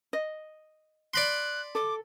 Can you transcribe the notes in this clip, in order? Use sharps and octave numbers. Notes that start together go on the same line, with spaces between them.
D#5
D5 B5 C6 F#6
A4 D6